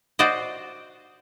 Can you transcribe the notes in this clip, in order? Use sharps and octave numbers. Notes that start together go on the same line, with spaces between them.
F#4 C5 D5 D#5